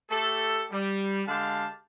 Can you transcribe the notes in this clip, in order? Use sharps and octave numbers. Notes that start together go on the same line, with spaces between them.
A3 G4 A4
G3
D3 G#3 G4 F5 A5